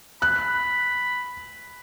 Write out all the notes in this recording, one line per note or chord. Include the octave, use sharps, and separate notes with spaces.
B5 F#6